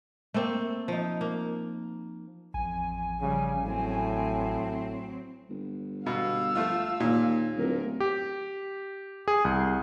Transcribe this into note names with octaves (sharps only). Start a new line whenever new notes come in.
A3 A#3 C4
F3 D#4
A#3
A1 F2 G#5
C#3 F3 G3
A2 F#3 C4
G1
B2 F5 E6
F3 A3 F4
D#2 A#2
D1 A#4
G4
G#4
C2